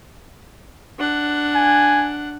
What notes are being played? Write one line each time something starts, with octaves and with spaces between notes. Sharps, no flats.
D4 F#5
G#5